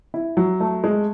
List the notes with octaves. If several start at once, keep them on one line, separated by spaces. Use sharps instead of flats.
E4
F#3
A3
G#3